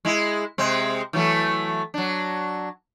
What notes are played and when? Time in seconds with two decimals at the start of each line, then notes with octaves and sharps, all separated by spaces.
0.05 G#3 E4
0.58 C3 G#3 C4
1.13 E3 F#3 A3
1.94 F#3 D4